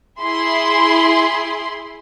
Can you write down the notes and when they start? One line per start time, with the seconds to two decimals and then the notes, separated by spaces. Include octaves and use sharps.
0.20 E4 G#4 C6